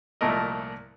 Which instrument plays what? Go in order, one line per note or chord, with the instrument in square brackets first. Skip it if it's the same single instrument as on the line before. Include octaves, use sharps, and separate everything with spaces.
[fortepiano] C2 A#2 F3 A3 A#4 D#5